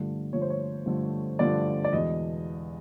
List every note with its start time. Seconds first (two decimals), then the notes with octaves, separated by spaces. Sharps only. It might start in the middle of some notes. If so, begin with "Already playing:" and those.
Already playing: G2 D3 F3 A3
0.33 G2 D3 F3 A3 C#5
0.42 C5
0.50 C#5
0.86 G2 D3 F3 A3
1.39 G2 D3 F3 A3 D5
1.84 D5
1.93 E2 B2 G#3 D#5